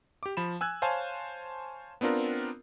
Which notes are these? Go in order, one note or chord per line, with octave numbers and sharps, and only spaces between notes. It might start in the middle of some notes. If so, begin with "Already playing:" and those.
G4 D6
F3 B5 E7
G#5 E6 F#6 G#6
C5 C#5 F5 G#5 A5
B3 C4 D4 F4 A#4